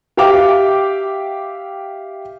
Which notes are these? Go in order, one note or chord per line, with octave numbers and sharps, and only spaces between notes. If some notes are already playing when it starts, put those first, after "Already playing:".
G4 E5 F5 G5 D6